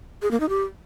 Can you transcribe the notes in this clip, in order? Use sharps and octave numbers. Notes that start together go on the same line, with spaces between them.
G#4
A#3
D#4
G4